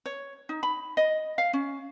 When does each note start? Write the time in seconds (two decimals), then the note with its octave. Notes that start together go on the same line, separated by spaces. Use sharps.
0.06 C#5
0.49 D#4
0.63 B5
0.97 D#5
1.38 F5
1.53 C#4